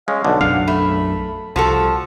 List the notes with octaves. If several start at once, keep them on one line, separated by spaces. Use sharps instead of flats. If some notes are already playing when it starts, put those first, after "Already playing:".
G#3 C#4 F5
B1 D3
B1 F#2 D4 F5 F#5
A3 B5
C2 F3 F#4 A4 A5